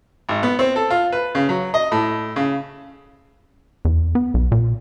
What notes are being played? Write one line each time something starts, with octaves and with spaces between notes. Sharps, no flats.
G#1
B3
C4
A4
F4
B4
C#3
F#3
D#5
A2
C#3
E2
B3
B1
A#2